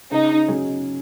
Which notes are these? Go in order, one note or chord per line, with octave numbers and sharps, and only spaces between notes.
C#3 D#4
F#3 C#4 G#4